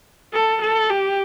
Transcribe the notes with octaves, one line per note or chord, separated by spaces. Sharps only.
A4
A4
G4